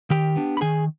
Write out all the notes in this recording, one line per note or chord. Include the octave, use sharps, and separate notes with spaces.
D#3 G4 G5
B3 D4
B5
D#3 G#4 G#5